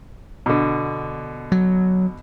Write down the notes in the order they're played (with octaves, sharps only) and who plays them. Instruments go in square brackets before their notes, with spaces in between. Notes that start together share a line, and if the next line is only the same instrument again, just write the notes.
[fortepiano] B2 D3
[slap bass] F#3